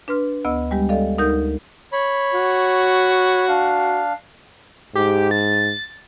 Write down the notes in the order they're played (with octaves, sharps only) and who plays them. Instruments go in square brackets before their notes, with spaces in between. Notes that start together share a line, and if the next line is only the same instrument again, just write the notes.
[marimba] D4 B4 C6 F6
D2 B3 D#5 E6
G3 G#3 G4
A4 D5 D#5 F5
D2 D#4 A#4 D#6 G6
[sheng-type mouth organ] C#5 B5
[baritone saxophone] F#4
[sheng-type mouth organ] D4 F5
[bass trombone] G#2 [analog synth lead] G4
[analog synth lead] A6